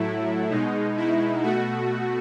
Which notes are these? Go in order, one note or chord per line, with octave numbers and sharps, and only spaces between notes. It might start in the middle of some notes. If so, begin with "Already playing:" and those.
Already playing: A2 F#3 A3 E4
B2 G#3 D#4
E4
B2 A3 F#4